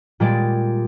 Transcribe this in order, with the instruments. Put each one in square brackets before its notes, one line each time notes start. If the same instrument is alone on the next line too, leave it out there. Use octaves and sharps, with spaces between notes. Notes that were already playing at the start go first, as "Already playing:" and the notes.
[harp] A#2 G3 G#3 D5